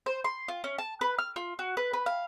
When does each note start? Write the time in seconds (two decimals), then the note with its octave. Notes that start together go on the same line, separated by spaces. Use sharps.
0.06 C5
0.24 C6
0.48 F4
0.64 C#4
0.78 A5
1.01 B4
1.19 F6
1.36 F4
1.59 F#4
1.77 B4
1.93 B4
2.06 F5